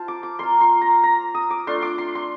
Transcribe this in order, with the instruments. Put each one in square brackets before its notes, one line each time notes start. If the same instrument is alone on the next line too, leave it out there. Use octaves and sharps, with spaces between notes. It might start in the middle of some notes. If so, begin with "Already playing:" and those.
Already playing: [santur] F4 C5 F5 A5
D6
D6
A#3 F4 C6
C6
A#5
A#5
D#6
D6
A3 D4 F4 C6
D6
C6
C6